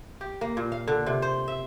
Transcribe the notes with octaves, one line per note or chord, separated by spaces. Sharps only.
G4
A#3
A#2
F5
D3
C3
C5
E5